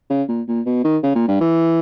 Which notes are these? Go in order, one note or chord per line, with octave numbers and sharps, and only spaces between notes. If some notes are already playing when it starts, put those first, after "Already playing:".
C#3
A#2
A#2
B2
D#3
C#3
A#2
G2
E3